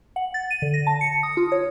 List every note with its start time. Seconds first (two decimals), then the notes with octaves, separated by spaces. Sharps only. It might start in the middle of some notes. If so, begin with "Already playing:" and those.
0.16 F#5
0.34 A6
0.51 D#7
0.62 D3
0.74 A#6
0.87 A5
1.01 C#7
1.23 D#6
1.37 F4
1.52 C#5